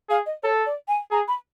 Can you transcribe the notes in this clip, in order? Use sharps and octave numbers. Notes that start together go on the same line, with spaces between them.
G#4 F5
D#5
A4 C#5
D5
G#5
G#4 A#5
B5